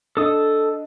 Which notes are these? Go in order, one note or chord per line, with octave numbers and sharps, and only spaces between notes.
D4 A4 D#5 D#6